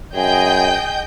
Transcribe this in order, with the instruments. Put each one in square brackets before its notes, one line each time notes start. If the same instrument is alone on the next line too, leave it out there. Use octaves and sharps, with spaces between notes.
[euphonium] F#2 [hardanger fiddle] G#4 [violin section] D#5 G5 G6